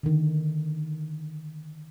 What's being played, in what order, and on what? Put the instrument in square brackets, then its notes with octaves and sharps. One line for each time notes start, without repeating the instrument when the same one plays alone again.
[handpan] D3 D#3